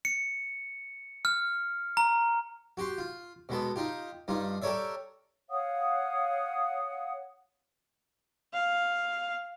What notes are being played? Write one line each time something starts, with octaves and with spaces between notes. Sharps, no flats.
C#7
F6
A#5
F#4 G4 G5 C6
F4
B2 G#3 B3 A4
D#4 F4 G4
G2 D#4 F4
G4 A4 A#4 C#5 D5 E5
C#5 F5 F#5 D#6
F5